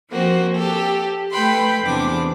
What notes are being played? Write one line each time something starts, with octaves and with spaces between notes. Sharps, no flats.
F3 A#3 C4 F#4
G4 A4
A3 B4 G5 B5 C6
E2 C3 D4 D6